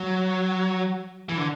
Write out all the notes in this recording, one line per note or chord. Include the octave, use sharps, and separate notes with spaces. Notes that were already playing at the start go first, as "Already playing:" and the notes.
Already playing: F#3
E3
D3